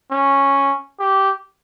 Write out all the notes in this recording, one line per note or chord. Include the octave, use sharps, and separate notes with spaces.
C#4
G4